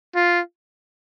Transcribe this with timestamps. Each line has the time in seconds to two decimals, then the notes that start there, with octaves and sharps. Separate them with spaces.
0.15 F4